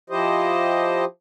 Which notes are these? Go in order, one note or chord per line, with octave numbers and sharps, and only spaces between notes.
F3 E4 G4 C5 D#5